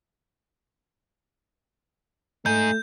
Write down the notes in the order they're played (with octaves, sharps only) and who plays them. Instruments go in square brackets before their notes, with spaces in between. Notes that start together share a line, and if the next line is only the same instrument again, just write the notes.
[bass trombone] A3 [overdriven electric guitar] D#4 G#4 [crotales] G6